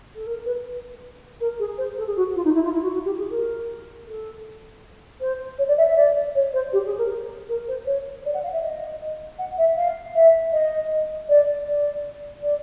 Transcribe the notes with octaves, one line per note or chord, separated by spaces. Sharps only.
A4
A#4
B4
A#4
G#4
C5
A4
G#4
F#4
F4
D#4
E4
F4
E4
F#4
F#4
G4
G#4
A#4
A4
C5
C#5
D5
E5
E5
D5
C#5
C5
G4
G#4
A#4
A#4
C5
C#5
D5
F#5
F5
E5
D#5
F#5
E5
F5
E5
D#5
D5
D5
D5